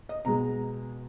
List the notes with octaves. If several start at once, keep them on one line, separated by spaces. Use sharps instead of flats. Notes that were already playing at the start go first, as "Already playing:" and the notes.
D#5
B2 G#3 A#5